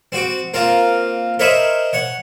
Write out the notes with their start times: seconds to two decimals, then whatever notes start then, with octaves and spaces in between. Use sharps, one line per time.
0.12 C4 F#4 D6
0.54 A#3 C4 F4 A#4
1.39 A#4 C5 C#5 D#5 E5 B5
1.93 C#5 F#5